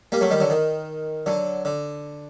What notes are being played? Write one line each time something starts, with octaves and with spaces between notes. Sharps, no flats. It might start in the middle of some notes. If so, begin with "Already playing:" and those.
G3 A#3
F#3 A3
D#3 G3
D3 F#3
D#3
D3 F#3
D3